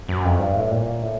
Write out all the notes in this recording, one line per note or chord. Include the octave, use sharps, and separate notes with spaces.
F#2
F2
G2
A2
A#2
A2